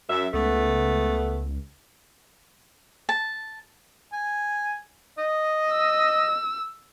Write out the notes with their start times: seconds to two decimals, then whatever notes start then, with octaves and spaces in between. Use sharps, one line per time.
0.09 F#2 E5
0.34 C#2 A3 B3
3.09 A5
4.13 G#5
5.18 D#5
5.71 E6